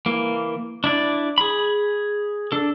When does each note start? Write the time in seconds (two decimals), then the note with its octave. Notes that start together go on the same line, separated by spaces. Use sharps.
0.06 E3 A#3
0.84 D4 E4 D5
1.38 G#4 B5
2.52 D4 A4